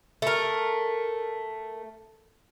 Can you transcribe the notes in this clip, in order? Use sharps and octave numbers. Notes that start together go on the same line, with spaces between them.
A3 A#4